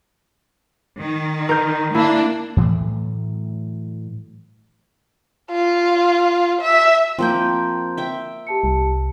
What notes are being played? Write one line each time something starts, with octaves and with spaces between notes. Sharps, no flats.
D#3
A#4 G6
A#3 D4 E4
A2 E3 F#3 A3
F4
E5
F3 A#3 C4 G5 C6 G6
E5 G5
G4 A5 C#7
C2